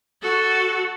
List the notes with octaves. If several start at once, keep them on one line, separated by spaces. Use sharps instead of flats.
F#4 A4